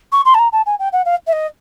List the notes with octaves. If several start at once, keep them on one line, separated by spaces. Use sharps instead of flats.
C#6
C6
A5
A#5
A5
G#5
G5
F#5
F5
E5
D#5